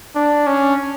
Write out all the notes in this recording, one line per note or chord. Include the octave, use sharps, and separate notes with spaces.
D4
C#4